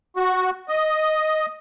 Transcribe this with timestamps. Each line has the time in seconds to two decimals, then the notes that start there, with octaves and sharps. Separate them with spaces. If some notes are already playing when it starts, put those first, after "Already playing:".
0.16 F#4
0.69 D#5